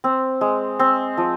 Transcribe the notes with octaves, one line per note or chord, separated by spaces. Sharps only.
C4
G#3
C4
F3